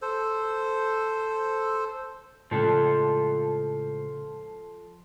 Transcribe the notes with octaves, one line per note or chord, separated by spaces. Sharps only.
A4 C5
A2 C#3 F3 G#3 A4